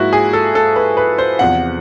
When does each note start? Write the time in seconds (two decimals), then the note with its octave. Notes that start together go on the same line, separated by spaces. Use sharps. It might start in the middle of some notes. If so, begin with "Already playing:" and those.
Already playing: G#2 F3 A#3 E4 F#4
0.13 G#4
0.33 A4
0.55 A4
0.76 B4
0.97 B4
1.19 C5
1.39 E2 C3 F3 F#5